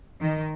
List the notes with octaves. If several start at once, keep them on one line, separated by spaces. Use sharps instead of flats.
D#3